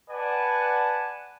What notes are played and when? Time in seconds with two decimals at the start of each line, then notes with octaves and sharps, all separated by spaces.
0.10 B4 D5 F#5 G#5 A5